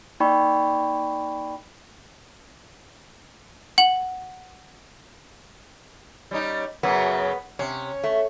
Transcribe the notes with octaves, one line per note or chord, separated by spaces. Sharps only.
A#3 D#4 D5 G5 B5 C#6
F#5 F#7
G3 C#4 D#4
F#2 C#3 F#3 B3
C3 C#4
A3